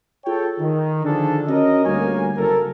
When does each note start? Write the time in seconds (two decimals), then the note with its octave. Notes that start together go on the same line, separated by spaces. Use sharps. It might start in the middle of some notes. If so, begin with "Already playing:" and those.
0.25 F4 G#4 A4 C#5 G5
0.59 D#3
1.04 D3 D#3 F3 D4 G#4 A4
1.48 C#4 F#4 A#4 D#5
1.84 D2 G3 A#3 C#5 G#5
2.37 F#1 A4 A#4